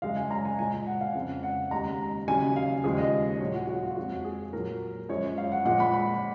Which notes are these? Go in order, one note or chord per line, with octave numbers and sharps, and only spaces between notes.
F#2 C#3 G#3 F5
G#5
A#5
G#5
A#2 G#3 G#5
F#5
F5
F2 C#3 G#3
F#5
D#2 C#3 G#3 A#5
D#2 C#3 F#3 G#5
F5
D#2 C#3 F3 G#3 G#4
D#5
A#2 F#3 C#5
F#4
F#4
F4
F2 F3 G#3 F#4
G#4
A#2 F#3 A#4
F#2 F3 G#3 C#5
F5
F#5
A#2 F3 G#3 F#5
B5
B5